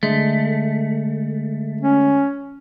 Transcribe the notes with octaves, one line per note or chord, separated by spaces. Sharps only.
D3 G#3 A3
C#4